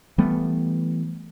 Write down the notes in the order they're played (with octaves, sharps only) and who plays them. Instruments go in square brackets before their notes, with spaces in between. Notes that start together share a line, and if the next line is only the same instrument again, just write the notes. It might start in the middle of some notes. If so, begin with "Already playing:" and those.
[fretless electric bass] E3 G3 A3 B3